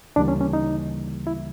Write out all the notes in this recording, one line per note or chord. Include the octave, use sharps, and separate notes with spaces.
D2 C#3 E3 G3 A#3 D4
C#4
C#4
D#4
E4